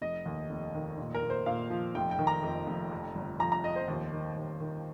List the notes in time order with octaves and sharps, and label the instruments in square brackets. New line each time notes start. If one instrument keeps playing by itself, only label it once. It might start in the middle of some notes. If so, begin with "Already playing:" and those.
[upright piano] F1 D#5
D#2
F1
D#3
A#2
A#4
A#2
C5
A#2 F5
F3
F1 G5
G5
D#3
A#5
F2
F1
F2
G1
F3 A#5
A#5
F3 D#5
C5
D#2
D#3
D#2
D#3